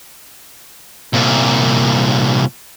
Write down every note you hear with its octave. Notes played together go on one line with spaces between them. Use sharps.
C2 A#2